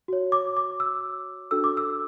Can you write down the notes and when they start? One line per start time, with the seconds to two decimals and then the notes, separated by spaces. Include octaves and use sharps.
0.08 F#4 C#5
0.32 D6
0.57 D6
0.80 E6
1.51 D4 F#4 A4 E6
1.64 D6
1.77 E6